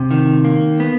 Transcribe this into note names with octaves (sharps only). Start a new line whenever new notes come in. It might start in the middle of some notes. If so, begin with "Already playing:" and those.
Already playing: C3
D#3
A#3
B3